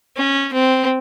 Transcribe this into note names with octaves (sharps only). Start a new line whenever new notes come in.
C#4
C4